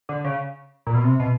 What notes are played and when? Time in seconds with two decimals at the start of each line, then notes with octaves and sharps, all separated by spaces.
0.09 D3
0.24 C#3
0.87 A#2
0.95 B2
1.04 C3
1.19 B2